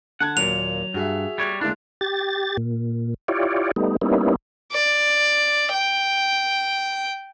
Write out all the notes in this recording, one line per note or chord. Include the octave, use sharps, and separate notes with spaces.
D3 F#5 A5 G#6
D#2 A#2 F#3 F7
G2 F#4 G#4 E5
G3 C#5
D2 G#3 A#3 D4 E4
G4 A6
A#2
E4 F4 G4 C#5 D5
G3 A3 B3 D#4
G3 A#3 B3 C#4 D#4 E4
D5
G5